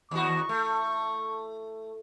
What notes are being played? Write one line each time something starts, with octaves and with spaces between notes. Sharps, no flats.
D#2 F#4 C#6
A3